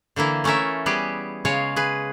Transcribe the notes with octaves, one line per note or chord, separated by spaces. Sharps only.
D3 E3 A#3 E4
A3 C#4 A4 A#4 E5
G3 B3 G4 G#4
C#3 G#3 C#5 F5
G#4 B4